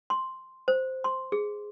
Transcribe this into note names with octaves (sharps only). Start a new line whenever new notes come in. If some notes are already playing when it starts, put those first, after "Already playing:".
C6
C5
C6
G#4